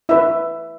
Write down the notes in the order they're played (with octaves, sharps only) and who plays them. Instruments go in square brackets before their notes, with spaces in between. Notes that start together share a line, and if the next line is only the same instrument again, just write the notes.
[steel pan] E4 B4 E5